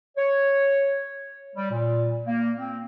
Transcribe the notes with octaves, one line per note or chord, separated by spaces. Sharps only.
C#5
G3
A#2
A#3
C4